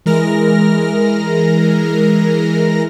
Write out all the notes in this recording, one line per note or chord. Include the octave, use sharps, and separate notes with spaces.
E3 G#3 A#4 F6 A#6